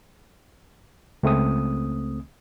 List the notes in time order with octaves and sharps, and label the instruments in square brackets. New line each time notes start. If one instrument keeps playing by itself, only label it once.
[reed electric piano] C#2 A3 C4 D#6